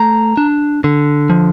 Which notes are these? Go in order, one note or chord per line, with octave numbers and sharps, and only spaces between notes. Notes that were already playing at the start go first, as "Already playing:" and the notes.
Already playing: A3 A#5
D4
D3
F3